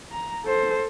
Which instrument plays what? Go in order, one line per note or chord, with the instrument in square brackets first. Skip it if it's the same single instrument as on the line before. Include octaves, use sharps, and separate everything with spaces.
[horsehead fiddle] A#5
A4 C5